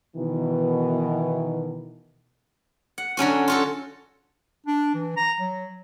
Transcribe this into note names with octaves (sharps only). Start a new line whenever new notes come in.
B2 D#3 E3
F#5
D3 F#3 C#4 F#4
F4 F#4 A4
D4
E3
A#5
F#3